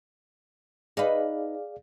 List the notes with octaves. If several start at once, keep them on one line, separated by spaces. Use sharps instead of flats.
D#4 G#4 B4 D5 F5